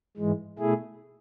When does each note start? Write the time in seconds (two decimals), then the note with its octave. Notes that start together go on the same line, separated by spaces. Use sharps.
0.17 G#2 E3 G#3
0.59 B2 A3 E4 G#4